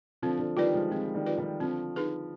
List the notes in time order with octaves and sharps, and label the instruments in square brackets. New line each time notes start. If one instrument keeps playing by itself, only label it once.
[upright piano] D3 F3 [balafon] C4
[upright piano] D3 F3
[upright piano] D#3 G3 [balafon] F4 B4 D5
[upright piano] F3 G#3
[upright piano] F3 G#3 [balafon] C4
[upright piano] D#3 G3
[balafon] F4 B4 D5
[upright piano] D#3 G3
[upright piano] D3 F3 [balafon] C4
[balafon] D#4 G#4 B4